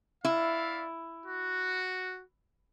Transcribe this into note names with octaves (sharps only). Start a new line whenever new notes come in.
E4 D5 E5 F5
F#4